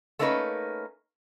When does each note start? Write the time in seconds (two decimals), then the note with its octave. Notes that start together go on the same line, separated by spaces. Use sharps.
0.19 A3 A#3 C#4 D#4 A#4 B4